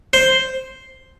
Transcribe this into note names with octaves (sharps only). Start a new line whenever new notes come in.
C5